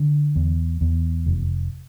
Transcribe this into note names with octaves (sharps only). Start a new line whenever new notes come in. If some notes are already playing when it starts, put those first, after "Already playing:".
Already playing: D3
E2
E2
F1